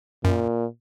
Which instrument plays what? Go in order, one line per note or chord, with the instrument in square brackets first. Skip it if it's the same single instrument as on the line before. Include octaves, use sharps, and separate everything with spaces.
[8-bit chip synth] F#2 [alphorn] A#2